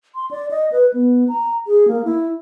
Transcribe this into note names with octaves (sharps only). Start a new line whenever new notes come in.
C6
D5
D#5
B4
B3
A#5
G#4
A#3
E4